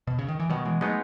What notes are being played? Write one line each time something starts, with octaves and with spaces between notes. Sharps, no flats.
B2
C#3
D#3
E3
B2 D#3 F#3
E3 G#3
F#3 G#3 A3 B3 D#4